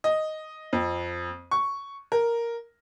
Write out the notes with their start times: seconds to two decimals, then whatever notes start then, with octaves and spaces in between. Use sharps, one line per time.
0.04 D#5
0.73 F2
1.51 C#6
2.12 A#4